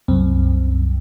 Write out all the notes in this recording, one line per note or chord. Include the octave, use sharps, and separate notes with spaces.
C2 F#2 C4